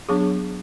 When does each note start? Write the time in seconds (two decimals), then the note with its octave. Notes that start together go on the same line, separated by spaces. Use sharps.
0.09 F#3 B3 D4 G#4